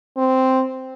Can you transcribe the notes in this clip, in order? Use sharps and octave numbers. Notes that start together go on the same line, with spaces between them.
C4